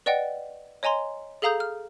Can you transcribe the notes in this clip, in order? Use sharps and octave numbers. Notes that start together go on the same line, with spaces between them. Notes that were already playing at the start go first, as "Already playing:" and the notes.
B4 D5 D#5 F#5 G5
C#5 D#5 G#5 A#5 C6
G#4 A4 F5 A#5 D#6 G6
F6